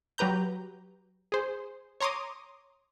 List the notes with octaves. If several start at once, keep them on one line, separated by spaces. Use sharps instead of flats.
F#3 G4 B4 A#5 G6
G#4 C5
C#5 A#5 C6 D6 D#6